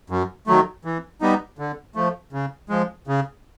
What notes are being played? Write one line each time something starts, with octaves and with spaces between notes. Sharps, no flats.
F#2
D#3 F#3 A3
E3
G3 B3 D#4
D3
F3 A3
C#3
F3 G#3
C#3